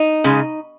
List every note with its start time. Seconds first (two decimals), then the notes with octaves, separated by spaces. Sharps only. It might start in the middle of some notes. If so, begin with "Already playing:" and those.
Already playing: D#4
0.24 C#3 G#3